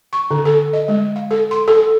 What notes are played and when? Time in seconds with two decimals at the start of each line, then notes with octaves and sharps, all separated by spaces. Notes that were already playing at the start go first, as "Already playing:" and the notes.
0.13 C#6
0.31 D3
0.45 A4
0.73 D#5
0.88 G#3
1.16 F5
1.31 A4
1.51 C6
1.68 A4